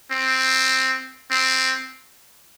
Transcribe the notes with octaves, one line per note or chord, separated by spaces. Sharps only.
C4
C4